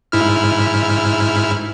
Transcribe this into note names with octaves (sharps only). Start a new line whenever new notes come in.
G#2 E4 F6